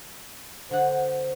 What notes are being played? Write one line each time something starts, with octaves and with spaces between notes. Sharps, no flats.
D3 C5 F#5